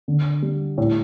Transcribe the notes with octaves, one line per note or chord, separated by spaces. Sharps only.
D3
G3
A2